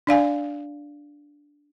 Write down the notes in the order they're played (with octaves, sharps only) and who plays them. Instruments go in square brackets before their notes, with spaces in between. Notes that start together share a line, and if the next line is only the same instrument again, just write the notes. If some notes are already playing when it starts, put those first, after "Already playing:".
[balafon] D4 D5 F5 G#5